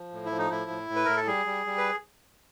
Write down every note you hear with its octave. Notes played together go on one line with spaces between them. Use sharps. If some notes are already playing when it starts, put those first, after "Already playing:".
Already playing: F3
A2
E4
F3
D#4
A2 E4
A2
A2
B4
A2 A#4
A4
G3 G#4
G3
G3
B4